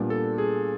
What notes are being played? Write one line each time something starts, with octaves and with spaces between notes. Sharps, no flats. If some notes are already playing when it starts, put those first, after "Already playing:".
Already playing: A#2 G3 B3 D4
A4
G#4